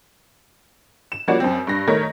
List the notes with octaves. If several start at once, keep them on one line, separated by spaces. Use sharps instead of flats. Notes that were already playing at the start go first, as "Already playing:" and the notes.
E7
F3 G3 A#3 C#4 F#4 D5
F#2 C4
G2 A#6
D#3 A3 A#4 C#5 A#6